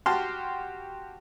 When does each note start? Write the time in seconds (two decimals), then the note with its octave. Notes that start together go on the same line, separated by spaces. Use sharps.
0.06 F#4 G4 A5 C6 F6